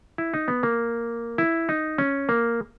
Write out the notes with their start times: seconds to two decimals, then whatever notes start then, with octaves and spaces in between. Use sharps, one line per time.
0.18 E4
0.34 D#4
0.48 B3
0.63 A#3
1.38 E4
1.69 D#4
1.98 C#4
2.29 A#3